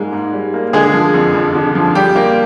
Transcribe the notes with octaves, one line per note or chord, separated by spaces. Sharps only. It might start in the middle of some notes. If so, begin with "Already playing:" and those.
Already playing: G#2 G3 G#3 A#3
G#2
G3
A#3
D3 G#3 G#4
F3
F2
F2
D3
F3
G3 G4
A#3